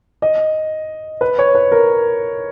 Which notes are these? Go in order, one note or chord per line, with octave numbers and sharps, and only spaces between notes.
D#5
B4
C#5
B4
A#4